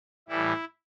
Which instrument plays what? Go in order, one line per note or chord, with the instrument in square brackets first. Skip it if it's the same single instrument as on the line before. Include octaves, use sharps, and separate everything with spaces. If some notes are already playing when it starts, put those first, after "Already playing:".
[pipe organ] A2 E3 G3 E4